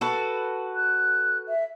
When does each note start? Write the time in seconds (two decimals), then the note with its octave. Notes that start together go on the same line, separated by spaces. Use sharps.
0.01 F#4 A4 B4
0.76 F#6
1.49 E5